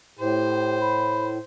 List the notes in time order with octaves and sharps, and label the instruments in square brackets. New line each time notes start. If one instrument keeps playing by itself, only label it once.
[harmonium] A2 [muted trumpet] G4 [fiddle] C5
[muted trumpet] B5